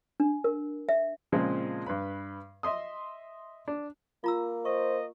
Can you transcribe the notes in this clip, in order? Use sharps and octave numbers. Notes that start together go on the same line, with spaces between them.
D4
A#4
E5
A#2 C#3 F3 G#3 C4
G2 B4 B5
D#5 E5 C6 D#6
D4
A#3 F4 A#5 E6
C5 D#5 C#6